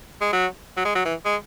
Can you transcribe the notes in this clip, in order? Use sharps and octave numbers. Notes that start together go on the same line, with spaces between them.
G#3
F#3
F#3
G#3
F#3
E3
G#3